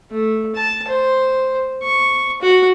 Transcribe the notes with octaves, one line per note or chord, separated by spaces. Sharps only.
A3
A5
C5
C#6
F#4